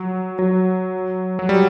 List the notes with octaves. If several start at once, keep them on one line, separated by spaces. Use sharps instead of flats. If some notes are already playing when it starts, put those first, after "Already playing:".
Already playing: F#3
F#3
F#3
G3